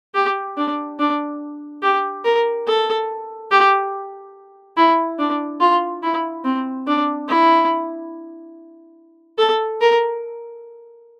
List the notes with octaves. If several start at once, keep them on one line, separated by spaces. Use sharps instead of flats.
G4
D4
D4
G4
A#4
A4
G4
E4
D4
F4
E4
C4
D4
E4
A4
A#4